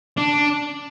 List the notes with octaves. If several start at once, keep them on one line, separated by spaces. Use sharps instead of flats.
D4